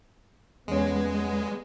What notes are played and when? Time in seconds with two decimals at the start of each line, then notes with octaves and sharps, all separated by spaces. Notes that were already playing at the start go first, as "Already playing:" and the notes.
0.68 E2 G#3 B3 C#4